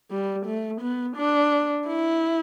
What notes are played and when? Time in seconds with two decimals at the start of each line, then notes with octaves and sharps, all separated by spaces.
0.11 G3
0.46 A3
0.81 B3
1.16 D4
1.87 E4